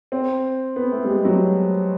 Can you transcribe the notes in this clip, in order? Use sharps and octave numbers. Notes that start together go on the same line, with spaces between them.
C4
B3
A3
G3
G#3
F#3